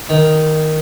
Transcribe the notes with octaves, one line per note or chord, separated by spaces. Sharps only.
D#3